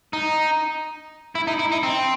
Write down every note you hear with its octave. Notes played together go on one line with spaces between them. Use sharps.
D#4
E4
D#4
E4
D#4
C4